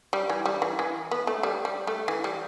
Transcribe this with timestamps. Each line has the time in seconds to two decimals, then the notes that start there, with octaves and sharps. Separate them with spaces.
0.13 G3
0.29 E3
0.46 G3
0.62 E3
0.79 E3
1.11 B3
1.27 A3
1.43 G3
1.65 G3
1.87 A3
2.08 E3
2.24 G3